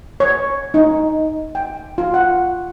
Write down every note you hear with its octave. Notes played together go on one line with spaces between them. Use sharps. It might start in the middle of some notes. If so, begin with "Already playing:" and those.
C#5
D#4
G5
F4
F#5